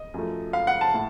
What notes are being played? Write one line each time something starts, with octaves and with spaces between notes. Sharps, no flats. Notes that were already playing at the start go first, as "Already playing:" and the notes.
Already playing: D#5
F#2 F3 A3
F5
F#5
A5
A2